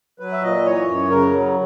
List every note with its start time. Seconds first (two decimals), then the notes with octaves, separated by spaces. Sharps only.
0.19 F#3 B4
0.32 E5
0.42 A#2 D#5
0.65 E3 C#5
0.87 F#2
1.10 C#3 A#4
1.33 F#3